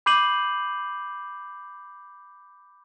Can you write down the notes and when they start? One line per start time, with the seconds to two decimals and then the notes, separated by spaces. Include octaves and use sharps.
0.06 B5 D6 G6 C7 D#7 F#7